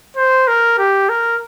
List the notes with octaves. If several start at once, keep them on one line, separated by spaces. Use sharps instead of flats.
C5
A#4
G4
A#4